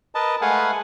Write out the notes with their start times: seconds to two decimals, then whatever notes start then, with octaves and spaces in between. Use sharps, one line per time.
0.15 A#4 B4 D#5 A5
0.42 G#3 A3 B4 F5 F#5 G#5